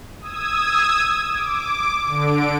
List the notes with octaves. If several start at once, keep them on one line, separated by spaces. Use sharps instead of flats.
D#6 E6 G#6
D6
D3 D7